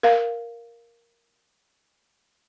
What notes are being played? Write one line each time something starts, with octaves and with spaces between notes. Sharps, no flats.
A#4 F5